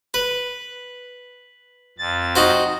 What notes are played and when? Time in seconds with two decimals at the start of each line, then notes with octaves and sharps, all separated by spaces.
0.14 B4
1.98 F2 A6
2.35 D#4 F#4 C5